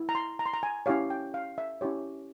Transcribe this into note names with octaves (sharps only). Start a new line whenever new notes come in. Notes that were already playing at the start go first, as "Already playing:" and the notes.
Already playing: E4
A#5
C6
A#5
C6
A#5
G#5
C#4 E4 G4 C#5 F5
G5
F5
E5
C#4 E4 G4 C#5